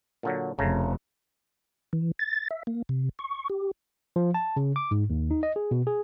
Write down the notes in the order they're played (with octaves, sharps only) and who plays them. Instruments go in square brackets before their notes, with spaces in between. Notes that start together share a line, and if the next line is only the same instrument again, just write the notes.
[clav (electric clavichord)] A#2 D3 F#3
[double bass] F1 [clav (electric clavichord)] C#3 A3 A#5
[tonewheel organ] E3
A6
E5
A#3
C3
C#6
G4
[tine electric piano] F3
A5
C#3
D6
G#2
D#2
D#4
D#5
G#4
B2
G#4